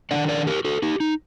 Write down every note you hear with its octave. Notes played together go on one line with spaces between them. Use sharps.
D#3 A3 D4 D5 F#5
A#4 D5
G4 A#4
F#4 A4
D#4 G4
D#4